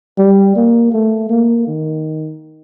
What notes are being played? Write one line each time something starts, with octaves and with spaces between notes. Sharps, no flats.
G3
A#3
A3
A#3
D#3